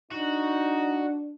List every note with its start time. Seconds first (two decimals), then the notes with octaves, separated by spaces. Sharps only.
0.11 D4 D#4 F#4